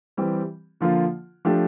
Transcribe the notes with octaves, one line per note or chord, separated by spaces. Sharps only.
E3 G3 C4 G4
D3 F3 A#3 F4
F3 A3 D4 G4